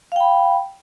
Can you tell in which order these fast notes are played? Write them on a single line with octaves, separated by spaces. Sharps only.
F5 G5 B5